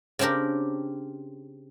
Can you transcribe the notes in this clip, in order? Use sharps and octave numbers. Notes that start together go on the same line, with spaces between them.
C#3 C4 D4 G4 A#4